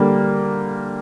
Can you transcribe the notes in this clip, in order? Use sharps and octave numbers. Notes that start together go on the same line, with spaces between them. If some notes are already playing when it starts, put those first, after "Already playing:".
Already playing: D3 G3 A#3